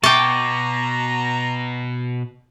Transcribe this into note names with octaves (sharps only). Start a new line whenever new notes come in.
B2 G5 A5 A#5 C#6 D6